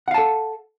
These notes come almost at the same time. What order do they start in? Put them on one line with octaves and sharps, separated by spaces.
F#5 F5 A5 A4